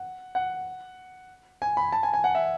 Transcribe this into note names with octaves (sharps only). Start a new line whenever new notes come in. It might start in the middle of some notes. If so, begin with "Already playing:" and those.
Already playing: F#5
F#5
G#5
B5
A5
G#5
G#5
F#5
E5